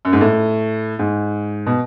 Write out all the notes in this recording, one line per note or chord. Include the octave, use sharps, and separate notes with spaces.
F#2
G#2
A2
G#2
B2